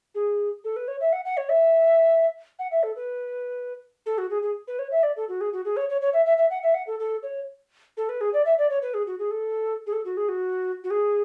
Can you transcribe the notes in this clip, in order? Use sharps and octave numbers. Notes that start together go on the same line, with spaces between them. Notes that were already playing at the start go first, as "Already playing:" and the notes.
G#4
A4
B4
C#5
E5
F#5
F#5
C#5
E5
F#5
E5
A4
B4
A4
F#4
G#4
G#4
B4
C#5
E5
D5
A4
F#4
G#4
F#4
G#4
C#5
C#5
C#5
E5
E5
E5
F#5
E5
F#5
A4
A4
C#5
A4
B4
G#4
D5
E5
D5
C#5
B4
G#4
F#4
G#4
A4
G#4
A4
F#4
G#4
F#4
F#4
G#4